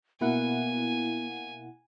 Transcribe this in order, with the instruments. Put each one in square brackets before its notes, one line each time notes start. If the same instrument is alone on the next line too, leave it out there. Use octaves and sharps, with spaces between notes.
[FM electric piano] B2 E4 F#5 [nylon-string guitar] A#3 [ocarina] B3 [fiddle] G#5